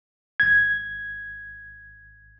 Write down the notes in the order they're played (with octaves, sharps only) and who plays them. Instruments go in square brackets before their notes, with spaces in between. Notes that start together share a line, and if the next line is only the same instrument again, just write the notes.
[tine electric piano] G#1 G#6